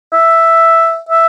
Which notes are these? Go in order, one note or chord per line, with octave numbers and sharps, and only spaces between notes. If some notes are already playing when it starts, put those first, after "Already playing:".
E5
E5